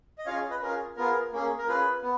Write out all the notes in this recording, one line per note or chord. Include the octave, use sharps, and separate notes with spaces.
D#5
C#4 F4 G#4 C#5 F5
B4 D#5
C#4 F4 G#4 A#4
B3 F4 G#4 A#4
A#3 C#4 G#4
A#4
C#4 F4 G#4 B4
B3